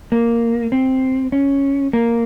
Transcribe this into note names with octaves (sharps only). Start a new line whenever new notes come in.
A#3
C4
C#4
A#3